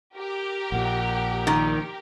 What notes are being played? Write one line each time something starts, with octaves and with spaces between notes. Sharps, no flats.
G4 A#4
A#1 A#2 F#5
D#3